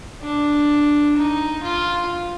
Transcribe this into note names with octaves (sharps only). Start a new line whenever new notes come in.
D4
D#4
F4